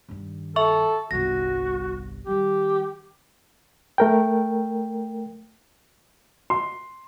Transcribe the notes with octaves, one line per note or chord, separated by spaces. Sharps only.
G2 D#3
A4 E5 C#6
G1 C2 F#4 A#6
D#3 G3 G4
A3 A#4 G5
C6